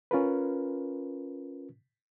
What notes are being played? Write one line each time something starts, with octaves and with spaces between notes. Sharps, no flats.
C#4 F4 A#4 B4